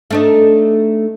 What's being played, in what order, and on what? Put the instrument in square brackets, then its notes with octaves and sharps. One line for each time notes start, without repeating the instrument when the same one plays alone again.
[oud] A3 D4 D#4